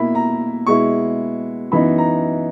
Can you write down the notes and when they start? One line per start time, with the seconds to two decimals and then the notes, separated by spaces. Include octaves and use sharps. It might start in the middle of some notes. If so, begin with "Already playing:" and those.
Already playing: B2 A#3 E4 B5
0.15 A#5
0.66 B2 G#3 B3 E4 C#6
1.71 F#2 E3 B3 D#4 B5
1.98 A#5